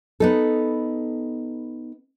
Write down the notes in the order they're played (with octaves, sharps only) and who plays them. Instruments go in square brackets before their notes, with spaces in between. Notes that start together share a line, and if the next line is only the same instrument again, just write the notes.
[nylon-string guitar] B3 D#4 A4